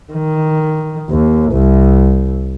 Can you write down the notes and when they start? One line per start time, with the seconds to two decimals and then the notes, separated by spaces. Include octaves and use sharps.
0.13 D#3
1.10 D#2
1.52 C2